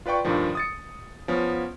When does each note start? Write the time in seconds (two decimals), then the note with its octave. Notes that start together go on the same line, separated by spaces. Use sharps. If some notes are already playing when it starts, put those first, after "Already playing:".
0.06 F4 B4 D5 G5 C#6
0.25 G2 A#2 D#3 F3
0.55 D#6 A6 C#7
1.28 F3 B3 C#4